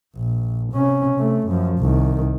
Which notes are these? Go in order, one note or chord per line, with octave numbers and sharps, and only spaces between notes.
A#1
C3 C#4
C3 A3
F#2 F3
C2 D#3